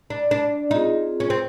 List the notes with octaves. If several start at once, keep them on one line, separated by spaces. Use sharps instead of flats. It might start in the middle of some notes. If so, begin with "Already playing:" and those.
D4
D4
C4 D#4 F4 G#4
C#4
C4